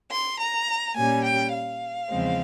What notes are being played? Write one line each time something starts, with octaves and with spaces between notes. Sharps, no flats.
C6
A#5
A#2 G3 C#4 G#5
G5
F5
E2 C#3 F3 G#3 C4